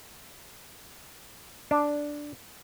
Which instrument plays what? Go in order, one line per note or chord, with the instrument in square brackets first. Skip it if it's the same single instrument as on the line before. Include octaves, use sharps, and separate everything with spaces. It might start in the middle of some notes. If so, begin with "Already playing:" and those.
[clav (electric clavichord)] D4